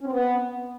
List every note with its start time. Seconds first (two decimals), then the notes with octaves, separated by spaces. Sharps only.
0.01 C#4
0.06 C4
0.12 B3